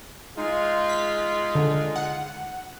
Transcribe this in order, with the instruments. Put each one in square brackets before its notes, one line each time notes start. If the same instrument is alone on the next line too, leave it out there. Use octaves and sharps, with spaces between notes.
[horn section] G#3 D#4 F4
[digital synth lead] B6
D3
F#5